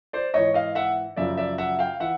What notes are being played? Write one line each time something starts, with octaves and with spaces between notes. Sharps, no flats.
C5 D5
G#2 E3 C#5 D#5
D#5 F5
E5 F#5
F#2 C#3 F3 D5 E5
D5 E5
E5 F#5
F5 G5
E3 E5 F#5